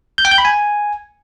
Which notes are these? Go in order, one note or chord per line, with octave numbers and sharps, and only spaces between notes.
G6
G5
G6
B5
G#5